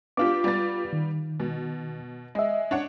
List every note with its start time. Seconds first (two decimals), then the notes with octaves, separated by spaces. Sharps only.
0.17 B3 D4 F4 G4 F5 D6
0.44 G3 B3 A6
0.93 D#3
1.40 B2
2.35 G#3 D#5 E5
2.71 D4 C#5 F#5